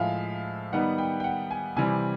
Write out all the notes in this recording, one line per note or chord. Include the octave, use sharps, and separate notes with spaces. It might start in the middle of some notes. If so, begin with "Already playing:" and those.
Already playing: A2 F3 G#3 E5 F5
D#3 G3 B3 D#4 F#5
G5
G5
F#5
G#5
C3 E3 G3 C4 G#5